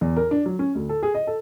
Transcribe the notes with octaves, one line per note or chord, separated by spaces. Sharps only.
E2
A#4
D4
F#3
C#4
D2
A4
G#4
D#5
A4